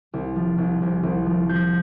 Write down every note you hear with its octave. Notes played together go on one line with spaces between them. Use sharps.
C2
F3
C2
C2
C2
F3
F3 G6